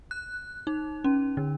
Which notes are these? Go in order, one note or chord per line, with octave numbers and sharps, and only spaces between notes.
F#6
D#4
C#4
D3